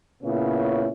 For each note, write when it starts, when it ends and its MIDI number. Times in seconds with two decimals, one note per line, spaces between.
0.23 0.89 46
0.23 0.89 49
0.23 0.89 59
0.23 0.89 61
0.23 0.89 64